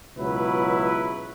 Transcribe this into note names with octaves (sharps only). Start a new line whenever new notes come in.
C#2 B2 F#3 E4 B4